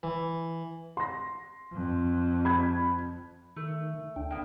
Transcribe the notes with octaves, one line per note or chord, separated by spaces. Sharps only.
E3
C6 A#6
F2
B5 G#6
D#3 A3
D2 D4 G5
A#3 B3